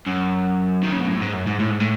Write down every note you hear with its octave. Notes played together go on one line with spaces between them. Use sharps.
F#2
D#3
C#3
B2
A2
G#2
F#2
G#2
A2
G#2
A2